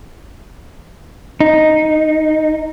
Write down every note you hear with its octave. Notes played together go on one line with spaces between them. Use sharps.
D#4